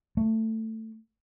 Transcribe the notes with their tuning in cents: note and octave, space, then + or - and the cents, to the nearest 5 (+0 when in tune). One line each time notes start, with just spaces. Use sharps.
A3 +15